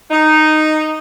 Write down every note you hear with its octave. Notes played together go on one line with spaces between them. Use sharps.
D#4